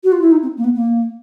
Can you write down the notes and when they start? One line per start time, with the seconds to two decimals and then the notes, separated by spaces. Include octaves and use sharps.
0.04 F#4
0.12 F4
0.22 E4
0.32 D#4
0.43 C4
0.57 A#3
0.64 B3
0.75 A#3